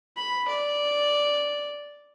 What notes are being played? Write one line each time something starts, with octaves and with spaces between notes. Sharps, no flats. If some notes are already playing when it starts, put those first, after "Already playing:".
B5
D5